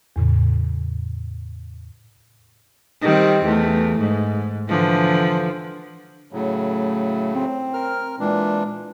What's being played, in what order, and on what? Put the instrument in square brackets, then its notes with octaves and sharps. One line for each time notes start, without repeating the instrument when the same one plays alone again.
[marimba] E2 A2 C#3
[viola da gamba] D#3 G3 C4
E2 A3
G#2
D3 E3 F3
[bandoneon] A2 C#3 F#3 [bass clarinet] A3
[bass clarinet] C4
[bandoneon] A#4 F6
[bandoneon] A#2 E3 D4 [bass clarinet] G#3